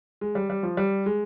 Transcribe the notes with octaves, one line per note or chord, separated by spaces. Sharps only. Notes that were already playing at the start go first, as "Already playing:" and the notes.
G#3
G3
G3
F3
G3
G#3